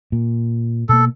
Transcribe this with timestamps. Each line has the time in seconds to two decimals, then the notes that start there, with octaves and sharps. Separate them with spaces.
0.12 A#2
0.89 B2 A#3 A4